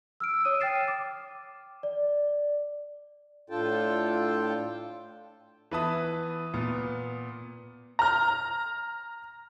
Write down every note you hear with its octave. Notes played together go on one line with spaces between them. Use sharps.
E6 F6 D7
C#5 D#6 D#7
G5 F6 A6 C7 E7
D6
D5
A2 D4 F4 A4 G5 A5
E3 B3 B4 E5 A5 D#6
A#2 B3
A#5 F6